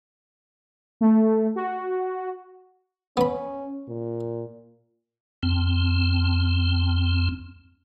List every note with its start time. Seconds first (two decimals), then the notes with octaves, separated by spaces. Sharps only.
1.01 A3
1.56 F#4
3.17 B3 C#4 B5
3.89 A#2
5.43 F2 C4